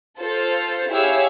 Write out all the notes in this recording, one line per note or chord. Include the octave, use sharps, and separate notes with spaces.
F4 A4 C5
E4 G4 G#4 C#5 F5 E6